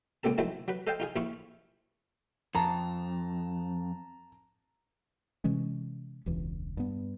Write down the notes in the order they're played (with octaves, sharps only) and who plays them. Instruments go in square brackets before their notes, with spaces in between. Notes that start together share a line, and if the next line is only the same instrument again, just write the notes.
[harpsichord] C#2 A#2 C4 A4 A5
D#3 F3 F#3 G#3 A3 E4
F#3 B4
A4 C5 D#5 F5 G5 A5
D#4 F4 G#4
A#1 F3 E4 F4 C#6
[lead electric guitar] F2 [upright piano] A5 A#5
[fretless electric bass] C3 E3 G#3 C#4
E1 C#2 E3
G2 B3